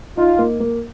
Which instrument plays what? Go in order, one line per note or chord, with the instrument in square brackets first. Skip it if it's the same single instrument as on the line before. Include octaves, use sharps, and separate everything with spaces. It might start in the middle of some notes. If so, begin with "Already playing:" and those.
[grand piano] D#4 [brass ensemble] F4
[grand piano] A#3
A#3